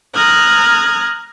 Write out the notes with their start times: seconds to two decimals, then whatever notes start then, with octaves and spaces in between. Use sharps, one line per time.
0.14 A#5 D#6 F6 F#6 G#6